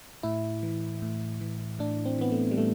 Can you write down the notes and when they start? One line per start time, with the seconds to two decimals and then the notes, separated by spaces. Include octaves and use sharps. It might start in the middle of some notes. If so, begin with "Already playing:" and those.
0.23 A2 E4
0.63 E3
1.02 A2
1.41 E3
1.79 A2 D4
2.05 C4
2.19 E3 B3
2.32 A3
2.51 G3
2.58 A2 A3